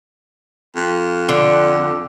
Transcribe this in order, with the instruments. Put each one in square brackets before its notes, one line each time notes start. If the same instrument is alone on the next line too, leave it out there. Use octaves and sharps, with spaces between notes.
[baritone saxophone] F2
[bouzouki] D3